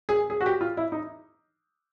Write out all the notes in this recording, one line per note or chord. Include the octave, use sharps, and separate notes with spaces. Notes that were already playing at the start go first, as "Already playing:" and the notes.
G#4
G#4
F#4
G4
F4
E4
D#4